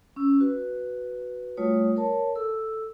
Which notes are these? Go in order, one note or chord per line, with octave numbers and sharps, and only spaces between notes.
C#4 E6
F#4 B4
G3 A3 F4 C#5 D#6
A#4 C#5 A5
A4 E6